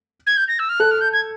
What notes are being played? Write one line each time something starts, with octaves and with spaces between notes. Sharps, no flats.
G#6
G6
A#6
E6
F6
A4 F#6
F6
G6
G#6